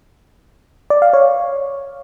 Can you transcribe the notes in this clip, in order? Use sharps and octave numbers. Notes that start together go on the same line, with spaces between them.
D5
F5
C#5